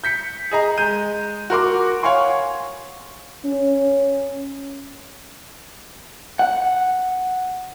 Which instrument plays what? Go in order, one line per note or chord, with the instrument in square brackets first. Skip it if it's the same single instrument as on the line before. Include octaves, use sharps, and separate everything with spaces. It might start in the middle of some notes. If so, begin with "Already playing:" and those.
[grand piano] G6 B6 C#7
G#4 D#5 A#5
G#3 G6 D#7
F#4 A#4 C6 D6
C#5 F5 F#5 G#5 C6 C#6
[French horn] C#4
[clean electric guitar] F#5